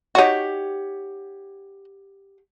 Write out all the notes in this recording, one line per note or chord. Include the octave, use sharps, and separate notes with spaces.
D#4 F#4 G4 C#5 F#5